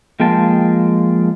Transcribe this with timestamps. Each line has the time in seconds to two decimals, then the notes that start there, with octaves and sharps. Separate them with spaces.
0.20 F3 G#3 A#3 G5 A5